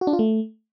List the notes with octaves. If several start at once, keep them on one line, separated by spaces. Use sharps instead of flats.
F#4
D4
F4
A3